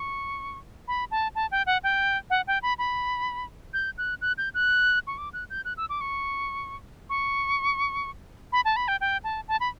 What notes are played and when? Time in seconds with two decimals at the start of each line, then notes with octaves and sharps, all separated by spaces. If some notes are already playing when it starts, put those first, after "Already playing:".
Already playing: C#6
0.88 B5
1.11 A5
1.35 A5
1.51 G5
1.66 F#5
1.84 G5
2.30 F#5
2.47 G5
2.62 B5
2.79 B5
3.74 G6
3.98 F#6
4.21 F#6
4.38 G6
4.54 F#6
5.07 C#6
5.18 D6
5.33 F#6
5.50 G6
5.65 F#6
5.77 E6
5.90 D6
6.01 C#6
7.10 C#6
8.52 B5
8.65 A5
8.76 B5
8.88 G5
9.01 G5
9.24 A5
9.48 A5
9.60 B5